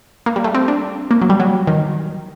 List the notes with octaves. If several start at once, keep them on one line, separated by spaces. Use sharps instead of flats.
A#3
G3
A3
C4
D4
A#3
F#3
G3
F#3
D#3